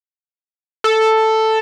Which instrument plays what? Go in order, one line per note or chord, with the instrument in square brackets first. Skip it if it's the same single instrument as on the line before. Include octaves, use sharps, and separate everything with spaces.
[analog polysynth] A4